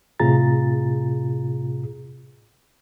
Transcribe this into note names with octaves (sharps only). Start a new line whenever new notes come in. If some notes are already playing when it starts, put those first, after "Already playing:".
A2 C3 F4 G#4 A#5 A6